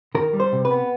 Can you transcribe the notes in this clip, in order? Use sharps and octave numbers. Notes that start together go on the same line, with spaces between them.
D#3 A#4
G3
C5
C3
B4
B3